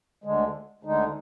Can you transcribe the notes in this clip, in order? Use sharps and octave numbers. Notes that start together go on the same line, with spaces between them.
D2 D3 G#3
D2 D3 G#3 D#4